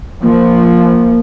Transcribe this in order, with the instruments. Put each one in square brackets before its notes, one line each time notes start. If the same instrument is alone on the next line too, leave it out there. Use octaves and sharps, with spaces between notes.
[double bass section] F3 [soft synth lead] A#3